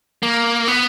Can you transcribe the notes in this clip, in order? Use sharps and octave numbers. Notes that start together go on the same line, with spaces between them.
A#3
B3